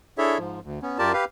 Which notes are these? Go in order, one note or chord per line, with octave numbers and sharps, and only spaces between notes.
D4 E4 G#4 A4 C#5 E5
G#2 F3
D2
B3 C#4
F#2 F4 G4 A#4 D5 A5
G4 B4 F5